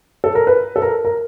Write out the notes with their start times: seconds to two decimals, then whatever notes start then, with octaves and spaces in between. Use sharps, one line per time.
0.24 A4
0.35 A#4
0.47 B4
0.76 A4
0.82 A#4
1.05 A#4